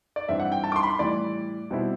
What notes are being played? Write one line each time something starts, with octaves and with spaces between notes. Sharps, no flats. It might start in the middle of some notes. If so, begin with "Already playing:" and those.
D5
G2 E3 G3 C4 E5
F#5
G5
A5
D6
C6
B5
C6
A2 E3 G3 D5
B2 G3 C4 E4